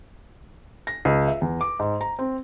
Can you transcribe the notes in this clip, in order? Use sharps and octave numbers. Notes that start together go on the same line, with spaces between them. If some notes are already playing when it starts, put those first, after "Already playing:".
A#6
C#2
E5
E2
D6
G#2
A#5
C4